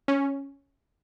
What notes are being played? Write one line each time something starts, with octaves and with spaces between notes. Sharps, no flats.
C#4